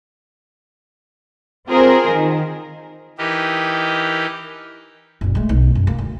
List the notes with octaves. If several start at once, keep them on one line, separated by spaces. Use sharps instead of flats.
C4 F4 G#4 A#4 C5
D#3
E3 D#4 G4 A#4 D#5
F#1 A#2
G#3 A3
B1
F#2
A#3
D2